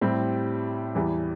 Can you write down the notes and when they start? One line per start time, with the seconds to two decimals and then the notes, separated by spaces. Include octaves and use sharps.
0.01 A2 G3 C4 G4
0.95 E2 E3 G3